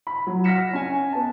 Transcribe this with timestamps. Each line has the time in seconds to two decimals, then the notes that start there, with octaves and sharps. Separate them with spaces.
0.07 B5
0.27 F#3
0.44 F#5 F6 A#6 B6 C#7 E7
0.73 C#4 G#5
1.13 B3 A5